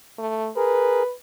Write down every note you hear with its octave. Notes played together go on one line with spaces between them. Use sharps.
A3
G#4 A#4 B4